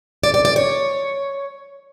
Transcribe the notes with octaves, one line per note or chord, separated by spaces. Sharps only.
D5
D5
D5
C#5